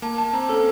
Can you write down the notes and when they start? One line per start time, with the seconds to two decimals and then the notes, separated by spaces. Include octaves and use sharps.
0.02 A#3 A5
0.18 A5
0.33 C4 A#5
0.49 C#4 A4